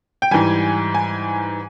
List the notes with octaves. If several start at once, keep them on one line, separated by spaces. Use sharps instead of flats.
G5
G#2 E3 G3 G#5
G#5